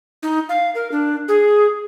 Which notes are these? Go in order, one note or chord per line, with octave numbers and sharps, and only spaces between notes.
D#4
F5
A#4
D4
G#4